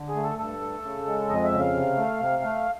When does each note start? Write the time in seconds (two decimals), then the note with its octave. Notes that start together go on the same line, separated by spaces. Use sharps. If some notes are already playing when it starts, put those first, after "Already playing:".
Already playing: D3
0.09 G#4
0.16 A3
0.23 A4
0.38 G2 A4
0.61 A3
0.84 C#3
1.07 G#3
1.29 F2 D#5
1.44 E5
1.52 C#3
1.60 F5
1.74 C3
1.97 A3
2.20 C3
2.43 A3